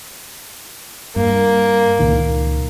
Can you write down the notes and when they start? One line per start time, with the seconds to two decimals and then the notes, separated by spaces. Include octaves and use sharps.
1.16 G2 A#3
1.99 C#2 A#2 D#3